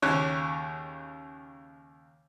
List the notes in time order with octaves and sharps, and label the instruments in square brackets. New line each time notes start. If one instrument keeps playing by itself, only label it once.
[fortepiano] D#2 C#3 C#5 F#6